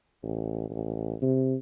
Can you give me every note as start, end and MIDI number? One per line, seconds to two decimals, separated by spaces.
0.23 0.68 33
0.70 1.14 33
1.22 1.55 48